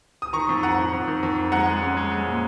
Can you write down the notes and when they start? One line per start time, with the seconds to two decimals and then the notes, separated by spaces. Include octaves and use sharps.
0.22 D#6
0.33 D#3 A#5 C#6
0.49 F2
0.63 F2 F#5 A#5
0.78 F2
0.93 F2
1.08 D#3
1.23 F2
1.38 F2
1.52 G#3 F#5 A#5
1.67 G#3
1.82 C#4
1.97 G#3
2.12 G#3
2.26 A#2